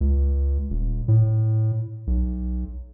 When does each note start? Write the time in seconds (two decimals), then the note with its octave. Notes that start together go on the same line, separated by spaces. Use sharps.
0.01 C#2
0.70 D#1
1.08 A2
2.07 B1